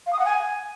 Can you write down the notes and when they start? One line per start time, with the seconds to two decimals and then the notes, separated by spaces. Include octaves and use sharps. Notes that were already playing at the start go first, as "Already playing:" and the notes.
0.06 F5
0.12 D#6
0.19 F#5
0.25 G#5